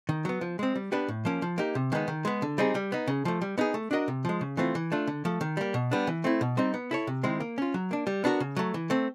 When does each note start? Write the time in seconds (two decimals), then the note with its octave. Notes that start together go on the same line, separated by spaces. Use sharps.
0.09 D#3
0.25 F#3 B3
0.41 F3
0.59 G#3 C4
0.76 G3
0.92 B3 D4 G4 B4
1.08 A2
1.25 F3 A#3 C#4
1.42 F3
1.58 A#3 D#4 G4
1.75 C3
1.92 D#3 G#3 B3 D#4
2.08 D#3
2.25 G#3 B3
2.42 D3
2.58 G3 C4 D#4 G#4
2.75 G3
2.92 B3 D#4
3.08 C#3
3.25 F3 A3
3.42 G3
3.58 B3 D#4 G#4
3.74 A3
3.91 D4 F#4 A#4 D#5
4.08 C3
4.25 F3 G#3
4.41 C#3
4.57 E3 A3 C4 F4
4.75 E3
4.92 A3 D4 F4
5.07 D3
5.25 F3 A3
5.41 D#3
5.57 G3 A#3
5.74 B2
5.91 G3 B3 D4
6.07 E3
6.24 A3 C4 E4
6.41 B2
6.57 G3 C4 D#4
6.74 B3
6.91 E4 A4 C#5
7.07 C3
7.23 D#3 G#3 C4 E4
7.40 A#3
7.58 C#4 F4
7.74 F#3
7.91 A#3 D4
8.07 G3
8.24 B3 D4 F#4 A#4
8.40 C#3
8.56 F#3 A3
8.74 E3
8.90 A3 C4